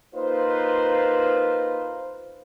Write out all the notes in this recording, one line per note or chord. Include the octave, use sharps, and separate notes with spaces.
A#3 D#4 F4 B4 C5